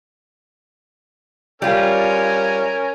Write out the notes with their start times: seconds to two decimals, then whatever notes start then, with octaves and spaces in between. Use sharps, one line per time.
1.62 G3 C#4 F4 A#4 G#5